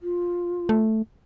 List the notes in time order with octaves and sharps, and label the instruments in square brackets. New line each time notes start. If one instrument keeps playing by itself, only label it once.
[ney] F4
[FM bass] A3